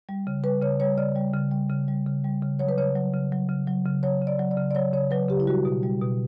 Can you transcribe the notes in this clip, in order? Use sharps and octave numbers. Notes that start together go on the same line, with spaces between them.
G3
C#3
G3 B4
C#3 C#5
G3 C#5
C#3 D5
G3
C#3
G3
C#3
G3
C#3
G3
C#3
F#3 C#5
B4
C#3 C#5
F#3
C#3
F#3
C#3
F#3
C#3
F#3 C#5
C#3
D5
F#3
D5
C#3
D5
F#3 C#5
C#3 C#5
F#3 B4
C#3 G4
E4
G3 F#4
B2
G3
B2